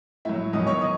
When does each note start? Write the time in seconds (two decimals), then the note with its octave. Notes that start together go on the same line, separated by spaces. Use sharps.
0.25 A2 F#3 E4 E5
0.53 E2 D#3 F#3 D#5 D#6
0.67 C#5 C#6
0.81 D#5 D#6